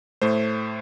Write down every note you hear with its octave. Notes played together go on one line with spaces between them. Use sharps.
A2 A3 C5